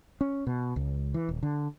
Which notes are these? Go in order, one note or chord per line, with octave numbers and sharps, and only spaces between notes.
C#4
B2
C#2
E3
D#1
D3